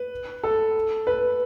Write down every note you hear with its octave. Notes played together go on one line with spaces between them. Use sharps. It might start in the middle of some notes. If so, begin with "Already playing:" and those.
Already playing: B4
A4
B4